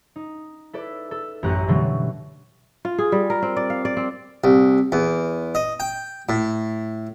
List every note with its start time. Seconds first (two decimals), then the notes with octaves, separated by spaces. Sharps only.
0.16 D#4
0.73 E4 A4 B4 D5
1.11 A4
1.43 A1 F#2 G4 A#5 F#6
1.68 B2 D3 E3 F#3 G3 A3
2.85 F4
2.98 G#4
3.12 G3
3.30 A#4
3.42 C4
3.56 D5
3.70 F5
3.85 D5
3.97 C4
4.44 C2
4.92 E2
5.55 D#5
5.80 G5
6.29 A2